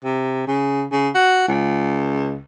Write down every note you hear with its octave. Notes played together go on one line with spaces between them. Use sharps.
C3
C#3
C#3
F#4
C#2